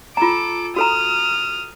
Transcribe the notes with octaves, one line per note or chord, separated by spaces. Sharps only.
F4 A4 A#5 D6
F#4 A4 A#5 D#6 F6